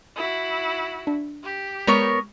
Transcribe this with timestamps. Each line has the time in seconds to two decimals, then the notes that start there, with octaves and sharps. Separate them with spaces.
0.16 E4 F#4
1.07 D4
1.43 G4
1.87 G#3 B3 A#4 C#5